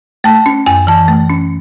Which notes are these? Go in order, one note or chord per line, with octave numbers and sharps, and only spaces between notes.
A3 A5
C#4
F#2 G#5
E3 A5
A3
C#4